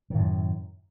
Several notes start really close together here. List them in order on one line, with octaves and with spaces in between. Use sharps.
D#3 A2 F#2